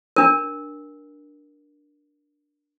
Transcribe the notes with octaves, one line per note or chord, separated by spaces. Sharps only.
D4 A#4